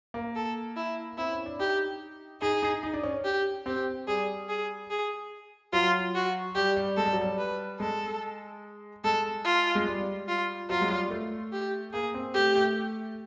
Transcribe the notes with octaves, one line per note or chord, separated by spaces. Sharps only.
A#3
A4
E4
C4 E4
C#4
D4
D#4 G4
D#4 G#4
D#4
D#4
D4
C#4
G4
C4 G4
G3 G#4
G#4
G#4
F#3 F4
F#4
G3 G4
G3
G#3 A4
G3
F#3
G3
B4
G#3 A4
G#3 A4
F4
G#3
G3
F4
F#3 F4
G#3
G3
A3
G4
A#3 G#4
C4
A3 G4
A3